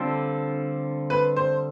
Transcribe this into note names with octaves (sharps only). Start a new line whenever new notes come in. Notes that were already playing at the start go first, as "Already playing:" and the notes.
Already playing: D3 G3 C4 F4 A4
B4
C5